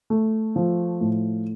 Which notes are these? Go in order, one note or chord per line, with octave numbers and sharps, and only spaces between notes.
A3
F3
A2